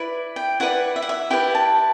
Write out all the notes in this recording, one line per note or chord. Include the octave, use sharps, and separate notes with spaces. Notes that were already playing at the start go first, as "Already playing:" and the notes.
Already playing: E4 B4 D5
G5
E4 B4 D5 F#5
E5
F#5
E5
E4 G4 B4 D5 G5
A5